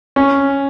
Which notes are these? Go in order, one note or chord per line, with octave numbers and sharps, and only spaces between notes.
C#4